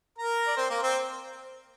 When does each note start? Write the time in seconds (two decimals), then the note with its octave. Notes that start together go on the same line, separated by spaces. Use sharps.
0.18 A#4 A#5
0.47 D5
0.57 C4 C5
0.69 A#3 A#4
0.83 C4 C5